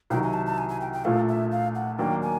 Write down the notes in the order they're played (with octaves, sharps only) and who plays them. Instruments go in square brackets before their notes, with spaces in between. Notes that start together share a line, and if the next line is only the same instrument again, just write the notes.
[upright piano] C2 C3 D#3 F#3 [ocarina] G5
[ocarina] G#5
A5
A5
G#5
G#5
G5
G5
[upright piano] A#1 A#2 F3 A3 [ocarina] F5
[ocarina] E5
F5
F#5
[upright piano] D#2 D#3 F#3 A#3 D4 [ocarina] G5
[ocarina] G#5